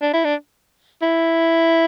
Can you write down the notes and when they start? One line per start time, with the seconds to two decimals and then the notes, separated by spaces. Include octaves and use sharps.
0.02 D4
0.14 E4
0.25 D4
1.02 E4